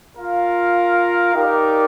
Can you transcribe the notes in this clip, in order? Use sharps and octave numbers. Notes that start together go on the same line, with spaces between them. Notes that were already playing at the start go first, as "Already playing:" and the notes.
F4 A#4 F5
D#4 G4 A#4 D5